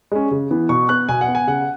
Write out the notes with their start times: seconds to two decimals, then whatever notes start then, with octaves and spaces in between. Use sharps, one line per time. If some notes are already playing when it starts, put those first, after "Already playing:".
0.11 G#3 C#4
0.31 C#3
0.51 E3 B3
0.69 B2 C#6
0.89 B3 F#6
1.09 B2 G#5
1.21 F#5
1.28 B3
1.35 G#5
1.47 C#3 F#5